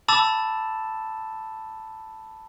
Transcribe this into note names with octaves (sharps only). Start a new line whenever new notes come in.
A5 B5 D6 E6 A6 E7